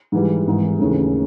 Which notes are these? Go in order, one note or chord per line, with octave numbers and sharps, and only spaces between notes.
G#2 E3 G3
G#1 G#2 E3
D#2 C#3 E3 A3